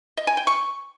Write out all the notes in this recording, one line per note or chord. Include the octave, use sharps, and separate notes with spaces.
D#5
G#5
G5
C#6